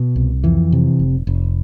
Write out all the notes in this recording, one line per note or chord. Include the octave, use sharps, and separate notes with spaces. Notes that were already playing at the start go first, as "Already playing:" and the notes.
Already playing: B2
C2
F2 E3
C3
F1
F1